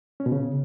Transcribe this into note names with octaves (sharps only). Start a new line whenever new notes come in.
C#4
B2
C#3